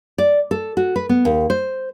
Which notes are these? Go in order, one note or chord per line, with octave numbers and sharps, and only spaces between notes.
D5
A4
F#4
B4
B3
D#2
C5